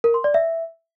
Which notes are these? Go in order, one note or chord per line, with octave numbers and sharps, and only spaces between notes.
A#4
C6
D5
E5